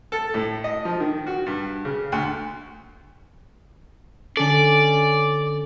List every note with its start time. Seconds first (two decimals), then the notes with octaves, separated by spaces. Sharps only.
0.12 A4
0.34 A2
0.64 D#5
0.85 F3
1.00 D#3
1.27 F#4
1.46 G2
1.85 C#3
2.12 D2
4.37 D3 C#4 A4 D5